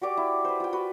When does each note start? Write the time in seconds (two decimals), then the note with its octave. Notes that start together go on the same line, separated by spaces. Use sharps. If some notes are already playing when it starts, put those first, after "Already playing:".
0.02 F#4 G4 D5 D6
0.17 E4
0.45 B4 C5
0.60 F4 G5
0.73 F#4 B4